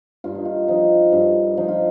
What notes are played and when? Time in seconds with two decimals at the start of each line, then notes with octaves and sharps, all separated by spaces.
0.24 G2 F4
0.35 D#4
0.45 F4
0.68 F3 D#4
1.12 G2
1.57 F3 D#4
1.68 F4